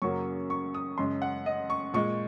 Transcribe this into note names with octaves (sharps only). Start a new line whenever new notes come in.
F#2 C#3 F#3 A#3 C#6
C#6
D#6
F#2 C#3 G#3 C6
F#5
D#5
C#6
A#2 G#3 C#6